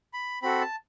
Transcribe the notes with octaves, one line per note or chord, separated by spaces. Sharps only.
B5
C4 F#4 A4 B5
A5